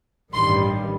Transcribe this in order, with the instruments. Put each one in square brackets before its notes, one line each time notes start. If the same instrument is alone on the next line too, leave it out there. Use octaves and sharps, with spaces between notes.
[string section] A1 G2 D#3 G3 C6